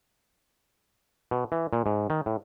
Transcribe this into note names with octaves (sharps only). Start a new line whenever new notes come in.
B2
E3
A#2
G#2
D#3
A2